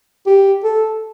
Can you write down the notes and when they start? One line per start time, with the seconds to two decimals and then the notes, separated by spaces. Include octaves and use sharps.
0.27 G4
0.64 A4